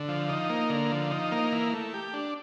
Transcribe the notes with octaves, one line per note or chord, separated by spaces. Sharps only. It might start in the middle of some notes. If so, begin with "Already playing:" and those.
Already playing: D3
F3
D#4
A#3
D3
F3
D#4
A#3
E3
A3
G4
D4